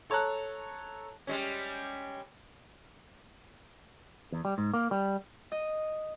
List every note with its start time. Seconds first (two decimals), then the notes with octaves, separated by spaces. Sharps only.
0.10 A4 C#5 A5 A#5 F#6
1.27 G3 G#3 C#4
4.32 E2
4.45 G3
4.58 G#2
4.74 A#3
4.91 G3
5.52 D#5